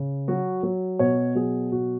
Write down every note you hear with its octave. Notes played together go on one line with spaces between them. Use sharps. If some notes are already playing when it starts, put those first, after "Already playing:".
Already playing: C#3
F#3 F#4
F#3
B2 C#5
F#3 G#4
B2 F#4